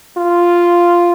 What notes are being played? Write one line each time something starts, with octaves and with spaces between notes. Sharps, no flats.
F4